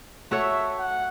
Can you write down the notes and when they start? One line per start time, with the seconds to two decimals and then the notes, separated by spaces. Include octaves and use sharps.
0.31 A3 F#4 A4 C#5 E5
0.79 F#5